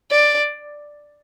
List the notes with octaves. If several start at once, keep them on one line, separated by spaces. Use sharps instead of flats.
D5